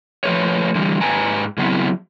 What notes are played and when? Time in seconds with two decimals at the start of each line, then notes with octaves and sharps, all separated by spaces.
0.24 F3 A3 B4 C#5
0.75 D3 E3 F3 G3
1.01 G#2 B4 G5 G#5 A#5
1.58 C#3 F#3 B3 C4 E4